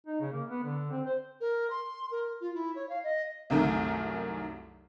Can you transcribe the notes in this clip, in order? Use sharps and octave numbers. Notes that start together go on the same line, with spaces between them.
D#4
C#3
A#3
B3
D3
C4
C5
A#4
C6
A#4
F4
E4
C#5
F5
D#5
C2 F#2 D#3 A3